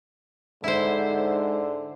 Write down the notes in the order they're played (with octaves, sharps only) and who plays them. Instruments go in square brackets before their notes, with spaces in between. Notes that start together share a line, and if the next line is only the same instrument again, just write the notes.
[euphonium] G#2 [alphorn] D3 [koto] E4 C5